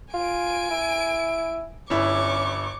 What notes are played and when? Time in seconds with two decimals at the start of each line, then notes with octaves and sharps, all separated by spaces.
0.13 F4 G#5 D7
0.71 E4
1.90 G1 C#4 E4 C#6 D6